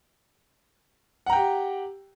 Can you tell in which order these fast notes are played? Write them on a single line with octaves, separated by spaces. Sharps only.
F#5 A#5 G5 G4